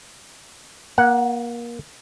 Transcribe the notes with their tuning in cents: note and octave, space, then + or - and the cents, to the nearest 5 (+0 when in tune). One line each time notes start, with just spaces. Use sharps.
A#3 +25 F#5 -5